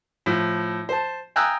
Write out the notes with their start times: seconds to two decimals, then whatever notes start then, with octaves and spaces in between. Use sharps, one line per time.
0.26 A2 F3
0.89 C5 A5
1.36 G5 G#5 A#5 D#6 E6 F#6